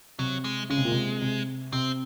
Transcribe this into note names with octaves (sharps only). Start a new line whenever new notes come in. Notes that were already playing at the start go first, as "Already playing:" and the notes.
C3 F#3
G#3
C#3 G#3
C3
A#2
C3
C3
C3 C4